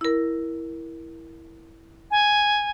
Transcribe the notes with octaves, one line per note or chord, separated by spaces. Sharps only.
E4 A#4
G#5